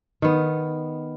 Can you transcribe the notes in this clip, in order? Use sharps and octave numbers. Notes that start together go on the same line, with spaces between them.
D#3 B3